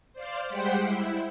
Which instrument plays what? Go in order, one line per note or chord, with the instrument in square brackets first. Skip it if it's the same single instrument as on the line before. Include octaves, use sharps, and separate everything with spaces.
[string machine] C5 D5 F5
G3 G#3 C5 F#5 G5 B6
E4